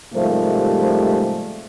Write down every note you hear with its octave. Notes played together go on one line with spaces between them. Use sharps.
G#2 C3 F3 G3 A3 A#3